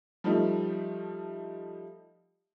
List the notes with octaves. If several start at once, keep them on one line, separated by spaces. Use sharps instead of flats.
F3 G3 A3 D#4